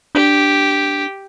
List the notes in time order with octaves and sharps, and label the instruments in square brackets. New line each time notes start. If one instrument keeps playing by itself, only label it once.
[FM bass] D4 [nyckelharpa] G4